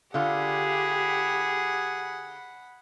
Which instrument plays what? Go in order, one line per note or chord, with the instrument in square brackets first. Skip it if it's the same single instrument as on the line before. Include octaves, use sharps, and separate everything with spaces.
[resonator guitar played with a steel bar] D3 F4 [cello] G4 [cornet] G#4 [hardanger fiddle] F#5 B5